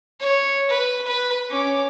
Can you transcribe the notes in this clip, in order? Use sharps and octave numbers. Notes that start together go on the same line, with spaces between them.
C#5
B4
B4
C#4 D6